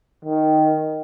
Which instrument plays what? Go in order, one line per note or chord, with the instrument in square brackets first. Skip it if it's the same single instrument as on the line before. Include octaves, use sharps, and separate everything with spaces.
[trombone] D#3